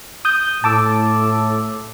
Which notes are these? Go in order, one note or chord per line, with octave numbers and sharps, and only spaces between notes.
D#6 G6
A2 A5 D6 E6